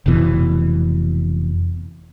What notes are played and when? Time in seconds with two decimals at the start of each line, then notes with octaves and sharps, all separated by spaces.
0.06 F1 F2 B2 E3